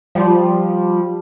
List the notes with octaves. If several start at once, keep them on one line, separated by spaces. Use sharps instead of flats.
F3 G3